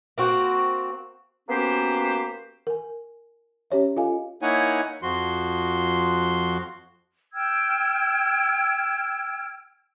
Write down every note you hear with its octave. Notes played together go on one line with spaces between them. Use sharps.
A#3 C4 F#4
A#3 B3 C#4 F#4 G4 C5
A#4 G#5
C#4 G4 C#5 E5
F4 A4 D#5 F5 G#5
A#3 D#4 E4 C#5 F#5 G#5
F2 F3 F#4 C6
G5 E6 F6 G#6